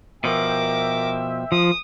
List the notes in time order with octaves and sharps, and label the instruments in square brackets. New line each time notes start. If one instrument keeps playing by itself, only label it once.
[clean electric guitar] B2 F3 [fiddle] A#4 D6 [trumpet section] E5 G5
[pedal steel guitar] F3 [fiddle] D#6